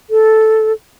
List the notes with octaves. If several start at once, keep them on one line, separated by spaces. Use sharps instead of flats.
A4